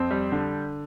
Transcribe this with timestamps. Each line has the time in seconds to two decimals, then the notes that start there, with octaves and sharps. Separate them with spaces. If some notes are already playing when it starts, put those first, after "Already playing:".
Already playing: F2 C4
0.11 G3
0.32 D3